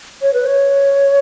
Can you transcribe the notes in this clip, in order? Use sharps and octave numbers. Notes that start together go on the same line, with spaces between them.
C#5
B4
C#5